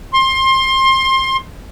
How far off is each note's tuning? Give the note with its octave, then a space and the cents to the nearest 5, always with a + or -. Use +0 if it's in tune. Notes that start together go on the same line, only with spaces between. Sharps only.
C6 +25